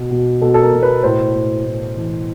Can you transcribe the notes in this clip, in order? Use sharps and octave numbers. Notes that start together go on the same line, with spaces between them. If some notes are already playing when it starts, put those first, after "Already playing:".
Already playing: B2
B2
B2 A4
A4
A#4
B2
B4
A2 C5
A2
A2
E3